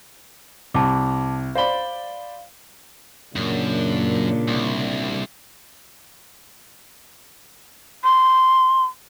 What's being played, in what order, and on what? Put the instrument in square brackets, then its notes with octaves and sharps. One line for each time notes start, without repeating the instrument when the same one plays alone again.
[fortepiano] C2 [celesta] A5 D6
[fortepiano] C5 D5 B5 [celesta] F5 G7
[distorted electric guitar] F#2 [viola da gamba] A#2 C#3 D4
[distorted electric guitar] C2
[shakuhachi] C6